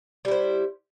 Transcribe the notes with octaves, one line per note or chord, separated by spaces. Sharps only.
G3 E4 C5